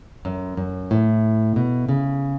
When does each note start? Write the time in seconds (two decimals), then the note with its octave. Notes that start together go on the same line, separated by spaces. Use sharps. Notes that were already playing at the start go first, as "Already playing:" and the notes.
0.25 F#2
0.57 F#2
0.91 A2
1.56 B2
1.89 C#3